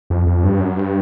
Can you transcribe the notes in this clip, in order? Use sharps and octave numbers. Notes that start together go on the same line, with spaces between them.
F2
F2
G2
F#2
G2